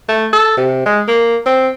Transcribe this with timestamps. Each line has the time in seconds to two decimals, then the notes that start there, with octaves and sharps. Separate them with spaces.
0.09 A3
0.33 A4
0.57 C3
0.86 G#3
1.08 A#3
1.46 C4